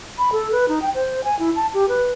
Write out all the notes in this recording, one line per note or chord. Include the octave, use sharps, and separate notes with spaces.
B5
A4
B4
D#4
G5
C5
G#5
E4
A5
G4
B4